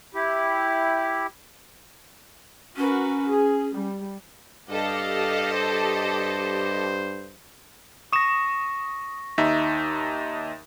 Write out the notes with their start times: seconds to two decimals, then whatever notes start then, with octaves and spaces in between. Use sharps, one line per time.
0.14 E4 G4
2.77 C#4 F#4 A#4 B4
3.28 G#4
3.75 G3
4.70 G2 G4 A4 D#5 F5
5.53 C5
8.12 C#6 D#6 A#6 E7
9.38 D#2 D#4 E5